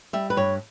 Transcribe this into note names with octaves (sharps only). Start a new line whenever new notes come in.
G3 E5
B4
G2 C#5